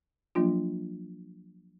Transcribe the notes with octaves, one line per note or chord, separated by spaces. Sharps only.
F3 F#3 A#3 D4 F4